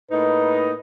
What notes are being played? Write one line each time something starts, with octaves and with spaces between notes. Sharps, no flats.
A2 A#3 D#4 B4